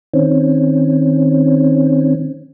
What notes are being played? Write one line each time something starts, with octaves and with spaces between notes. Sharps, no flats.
D#3 C4 C#4